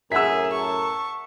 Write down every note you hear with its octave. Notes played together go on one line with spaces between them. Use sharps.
F#2 A2 G#4 A#4 E5 F#5 E6 B6
A5 C#6